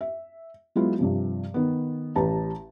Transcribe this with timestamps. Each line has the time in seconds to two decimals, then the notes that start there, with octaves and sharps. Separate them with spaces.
0.01 E5
0.76 F#3 G#3 B3 E4 F4
0.99 G2 C3 F3
1.54 D#3 B3
2.16 A1 G4 B4 A5 A#5